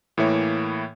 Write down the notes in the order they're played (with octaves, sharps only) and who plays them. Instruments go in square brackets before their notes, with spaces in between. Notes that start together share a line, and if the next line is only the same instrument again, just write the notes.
[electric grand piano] A2 E3 A#3 E4 C#5